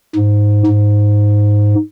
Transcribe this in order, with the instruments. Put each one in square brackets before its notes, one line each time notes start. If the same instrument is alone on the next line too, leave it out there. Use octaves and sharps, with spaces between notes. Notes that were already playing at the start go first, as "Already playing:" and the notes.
[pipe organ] G#2
G#2